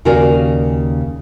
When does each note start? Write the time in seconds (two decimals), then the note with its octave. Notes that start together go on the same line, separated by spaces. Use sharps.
0.05 D#2 C#3 F#4 A#4 D5 G#5